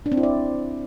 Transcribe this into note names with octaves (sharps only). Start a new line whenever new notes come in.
D4
C4
E4
D5